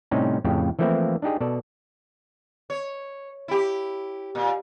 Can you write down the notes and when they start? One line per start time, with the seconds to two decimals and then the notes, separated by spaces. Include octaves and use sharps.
0.11 A2 C3 G3 C#4 D#4
0.44 F2 A2 C#3 G4
0.79 E3 F3 A3 A#3 C4 E4
1.22 D4 D#4 G4 G#4
1.40 B2 A4 D5
2.70 C#5
3.48 E4 G4
4.35 A#2